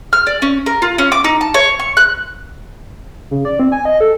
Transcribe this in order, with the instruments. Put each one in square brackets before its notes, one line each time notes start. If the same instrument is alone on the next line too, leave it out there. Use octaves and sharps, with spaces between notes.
[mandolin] F6
D5
C#4
A#4
F4
C#4
D6
D#4
A5
C#5
C#6
F#6
[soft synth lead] C#3
D5
C4
G#5
D#5
A4